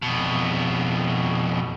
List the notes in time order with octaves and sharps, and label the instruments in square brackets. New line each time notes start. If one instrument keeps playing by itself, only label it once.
[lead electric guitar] F2 B2